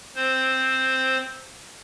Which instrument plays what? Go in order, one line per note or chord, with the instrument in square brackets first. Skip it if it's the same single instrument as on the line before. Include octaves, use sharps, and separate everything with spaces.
[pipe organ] C4 C5